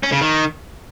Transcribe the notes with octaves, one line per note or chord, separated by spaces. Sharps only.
C#4
C#3
D#3